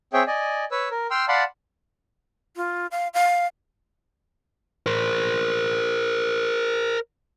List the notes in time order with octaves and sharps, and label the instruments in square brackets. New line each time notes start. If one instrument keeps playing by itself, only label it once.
[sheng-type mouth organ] C4 G#4 C#5 E5 G5
D5 D#5 G#5
B4 C#5 E6
A#4
G5 C6 E6 F6
D5 F5 F#5 A5 B5 C6
[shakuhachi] F4
F5
F5
[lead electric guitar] A#4 C5